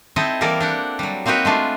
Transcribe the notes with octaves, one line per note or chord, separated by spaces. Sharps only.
C4 D#4 E4 A4 D#5
E3 G3 A#3 A4 A#4 D5
D4 G4 F#5
F#3 G3
A#3 C4 D#4 F#4 B4 C#5
G#3 A3 D4 F4